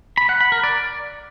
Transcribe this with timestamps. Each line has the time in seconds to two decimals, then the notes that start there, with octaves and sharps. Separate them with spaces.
0.17 B5
0.29 F#5
0.40 B5
0.52 A#4
0.64 D5